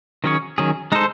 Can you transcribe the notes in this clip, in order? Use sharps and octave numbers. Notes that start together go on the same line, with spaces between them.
D#3 F#3 C#4 G#4 C#5
D#3 F#3 C#4 G#4
G#3 D#4 A4 C5